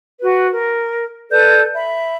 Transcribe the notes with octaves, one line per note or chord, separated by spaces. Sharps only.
F#4 B4
A#4
A4 B4 D5 G6
E5 B5